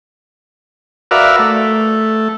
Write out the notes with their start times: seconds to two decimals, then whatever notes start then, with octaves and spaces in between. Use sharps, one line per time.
1.11 F#4 A#4 B4 D5 E5 F5
1.39 A3